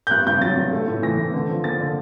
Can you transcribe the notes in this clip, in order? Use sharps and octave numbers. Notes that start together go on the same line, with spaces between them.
G6
G2 F#6
G2 G6
F#3 A6
G2
A3
A2
E3 A#6
A2
D3
F3
A#3 A6
D3